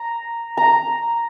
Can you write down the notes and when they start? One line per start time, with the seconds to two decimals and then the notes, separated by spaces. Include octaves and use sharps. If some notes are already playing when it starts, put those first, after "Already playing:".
Already playing: A#5
0.57 A#5